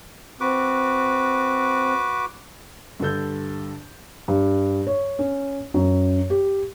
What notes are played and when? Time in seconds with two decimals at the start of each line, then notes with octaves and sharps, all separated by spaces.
0.41 C4 F#4 B4 D6
3.00 G2 D3 A4 G6
4.28 G2
4.87 C#5
5.19 C#4
5.74 F#2
6.30 G4